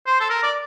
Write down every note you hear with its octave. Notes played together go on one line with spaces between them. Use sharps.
C5
A4
A#4
D5